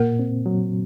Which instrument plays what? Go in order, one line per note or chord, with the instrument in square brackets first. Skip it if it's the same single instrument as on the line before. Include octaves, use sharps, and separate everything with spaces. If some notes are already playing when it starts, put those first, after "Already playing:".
Already playing: [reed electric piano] A#2 [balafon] A#3 A#4
[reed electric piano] C4
F#3